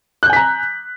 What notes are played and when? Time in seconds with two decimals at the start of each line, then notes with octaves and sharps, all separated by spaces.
0.23 F#6
0.26 G6
0.30 G#5
0.33 B6
0.36 A#5